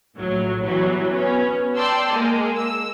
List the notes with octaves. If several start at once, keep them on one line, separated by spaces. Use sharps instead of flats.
A#1 A2 F#3
E3 F#3 G3 B3
B3 C#4
D5 G5 A5 C6 E6
G#3 A#3
E6